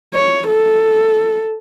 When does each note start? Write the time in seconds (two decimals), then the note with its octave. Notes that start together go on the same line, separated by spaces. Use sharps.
0.14 C#5
0.48 A4